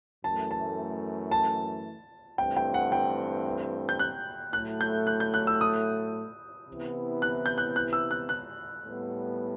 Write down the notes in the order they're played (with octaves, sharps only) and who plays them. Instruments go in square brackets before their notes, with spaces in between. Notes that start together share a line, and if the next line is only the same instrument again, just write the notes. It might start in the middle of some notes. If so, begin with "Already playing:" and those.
[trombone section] F#2 E3 A3 [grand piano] A5
[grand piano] A5
A5
[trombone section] G2 E3 A3 C4 [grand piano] G5
[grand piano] G5
F#5
G5
G6
F#6
[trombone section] A2 F#3 A3 [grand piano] F#6
[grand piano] G6
F#6
G6
F#6
E6
D#6
[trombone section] C3 E3 B3 E4
[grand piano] F#6
G6
F#6
F#6
E6
F#6
F#6
[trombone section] A2 G3 B3